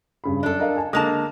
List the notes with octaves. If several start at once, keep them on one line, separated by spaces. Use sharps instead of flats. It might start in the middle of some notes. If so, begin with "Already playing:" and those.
G2 C#3 B5
F#2 D4 A4
A#4 D#5 F5
G#5 A5
D3 G#3 A#3 A5 D#6